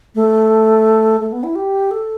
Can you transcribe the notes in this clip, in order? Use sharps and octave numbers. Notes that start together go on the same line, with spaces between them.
A3
A3
B3
E4
G4
A4